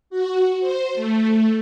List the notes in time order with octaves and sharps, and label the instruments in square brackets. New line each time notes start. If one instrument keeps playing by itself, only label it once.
[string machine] F#4
C5
A3